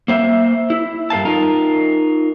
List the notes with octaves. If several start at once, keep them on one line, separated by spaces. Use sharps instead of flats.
A#3 C5 E5
E4
G2 A#4 F5 A5
D#4 F4 A#4